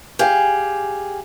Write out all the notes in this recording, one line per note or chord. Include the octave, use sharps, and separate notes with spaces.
G4 G#4 F5